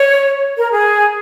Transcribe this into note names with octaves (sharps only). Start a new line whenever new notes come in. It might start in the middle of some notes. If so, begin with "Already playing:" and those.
Already playing: C#5
A#4
G#4